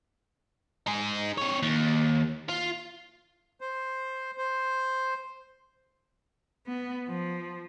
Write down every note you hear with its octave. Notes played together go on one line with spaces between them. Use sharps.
D#4 G#4
C4 C#5
D#2
F4
C5
C5
B3
F3